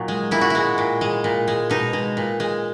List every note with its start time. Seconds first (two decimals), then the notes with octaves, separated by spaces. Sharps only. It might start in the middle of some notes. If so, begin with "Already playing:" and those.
Already playing: A#2 F#3 D#4
0.08 G#3
0.31 A#2 E4
0.41 F#4
0.50 G#3 E4
0.78 A#2
1.01 G#3
1.24 A#2
1.48 G#3
1.70 B2 D#4
1.93 G#3
2.17 A#2
2.40 G#3